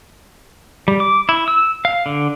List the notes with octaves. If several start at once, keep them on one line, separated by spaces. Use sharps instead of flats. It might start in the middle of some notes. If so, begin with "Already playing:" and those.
G3
D6
E4
E6
F5
D3